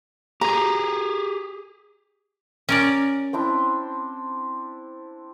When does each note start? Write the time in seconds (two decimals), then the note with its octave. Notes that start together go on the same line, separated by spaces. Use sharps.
0.41 G4 G#4 A#5
2.69 C#4 A#4 D5
3.33 C4 D4 E4